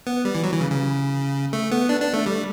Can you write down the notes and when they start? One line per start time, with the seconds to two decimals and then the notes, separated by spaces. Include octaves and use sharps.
0.07 B3
0.25 G3
0.35 E3
0.43 F#3
0.53 E3
0.61 C#3
0.71 C#3
1.53 A3
1.71 B3
1.89 D4
2.01 D4
2.13 A3
2.26 G3